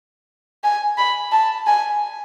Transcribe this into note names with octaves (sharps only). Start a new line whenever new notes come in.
G#5
B5
A5
G#5